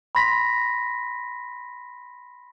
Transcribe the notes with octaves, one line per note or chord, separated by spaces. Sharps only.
B5 C6 A#6 B6